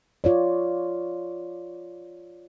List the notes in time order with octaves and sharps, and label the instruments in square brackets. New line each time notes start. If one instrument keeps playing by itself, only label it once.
[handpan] F4 C#5 D5